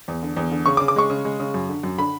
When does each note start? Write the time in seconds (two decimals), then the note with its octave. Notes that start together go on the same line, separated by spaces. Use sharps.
0.08 E2
0.23 D3
0.37 E2
0.52 D3
0.66 C#3 C#6
0.77 D6
0.80 C#3
0.88 D6
0.96 G#3 C#6
1.10 C#3
1.25 G#3
1.40 C#3
1.54 F#2
1.69 D3
1.83 F#2
1.98 D3 B5